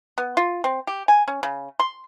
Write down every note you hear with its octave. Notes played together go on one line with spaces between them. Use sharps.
B3
F4
C4
G4
G#5
C#4
C#3
C6